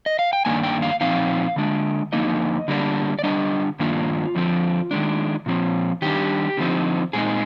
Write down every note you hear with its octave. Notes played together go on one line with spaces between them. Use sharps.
D#5
F5
G5
G2 D#3 A#3 D4 G#5
G5
F5
A#2 F3 C4 D#4 F5
D3 G#3 D4
F2 D3 G3 A#3 D#4 D#5
D3 G3 A#3 D4
D5
D3 G3 D4 D#5
G2 D#3 A#3 D4 F4
F2 D3 F3 C4
D#3 G#3 D4
A#2 F3 C4
D#3 G3 D4 G4
D3 F3 C4 D#4
A#2 G#3 C4 D#4 G#4